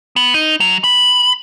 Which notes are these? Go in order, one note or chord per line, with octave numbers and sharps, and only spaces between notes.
B3
D#4
F#3
B5